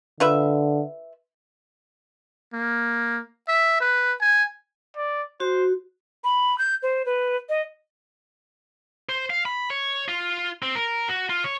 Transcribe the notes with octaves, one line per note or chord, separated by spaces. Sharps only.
D3 F4 B4 E5
A#3
E5
B4
G#5
D5
F#4 C5
B5
G6
C5
B4
D#5
C5
F5
B5
C#5
F4
C4
A#4
F#4
F4
C#5